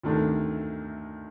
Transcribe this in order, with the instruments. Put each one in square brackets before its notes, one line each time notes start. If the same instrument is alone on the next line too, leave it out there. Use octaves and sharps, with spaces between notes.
[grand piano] D2 C3 D#3 A3 D4